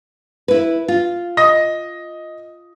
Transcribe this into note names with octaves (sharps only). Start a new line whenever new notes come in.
E4 B4
F4
D#5 D#6 A#6